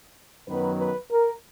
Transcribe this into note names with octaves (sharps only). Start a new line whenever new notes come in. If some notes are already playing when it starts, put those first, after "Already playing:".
F#2 D#3 F#3 B3 B4
B4
A#4